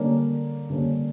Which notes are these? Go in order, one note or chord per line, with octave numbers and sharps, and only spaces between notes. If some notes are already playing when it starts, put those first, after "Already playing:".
Already playing: D3 G3 A#3 C#4
D3 G3 A#3 C#4